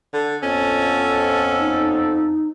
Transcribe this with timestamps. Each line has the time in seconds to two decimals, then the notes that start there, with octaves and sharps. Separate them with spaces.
0.13 D3
0.42 F2 B3 C#4 A4
1.60 D#4